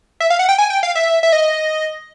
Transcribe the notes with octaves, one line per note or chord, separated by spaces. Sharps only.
E5
F5
F#5
G5
G#5
G5
F5
E5
E5
D#5